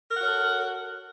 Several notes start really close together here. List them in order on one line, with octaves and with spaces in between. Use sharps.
A#4 F#5 F#4 C#5 A4